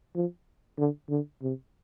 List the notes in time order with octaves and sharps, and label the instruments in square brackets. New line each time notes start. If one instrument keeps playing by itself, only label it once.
[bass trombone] F3
D3
D3
C3